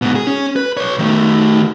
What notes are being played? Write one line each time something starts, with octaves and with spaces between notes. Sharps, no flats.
G#2 B2
G#4
C#4
B4
B4 C#5
D#3 A3